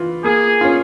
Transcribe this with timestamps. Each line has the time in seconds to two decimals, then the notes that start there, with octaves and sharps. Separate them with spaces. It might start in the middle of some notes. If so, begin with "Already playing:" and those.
Already playing: E3 F4
0.24 A#3 G#4
0.61 C#4 F4